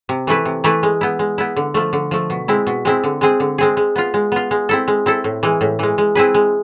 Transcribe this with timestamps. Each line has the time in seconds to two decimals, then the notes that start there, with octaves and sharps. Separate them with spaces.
0.09 C3
0.27 E3 A3 E4 B4
0.45 C3
0.64 E3 A3 E4 B4
0.83 G#3
1.01 B3 E4
1.19 G#3
1.38 B3 E4
1.56 D3
1.74 F3 A3
1.93 D3
2.11 F3 A3
2.30 B2
2.48 G#3 C4 E4
2.67 B2
2.85 G#3 C4 E4
3.04 D3
3.21 G#3 C4 G#4
3.40 D3
3.58 G#3 C4 G#4
3.77 G#3
3.96 B3 F4
4.14 G#3
4.32 B3 F4
4.51 G#3
4.69 C4 E4 A4
4.88 G#3
5.06 C4 E4 A4
5.24 A2
5.43 E3 G#3
5.61 A2
5.79 E3 G#3
5.98 G#3
6.15 C4 E4 G#4 B4
6.34 G#3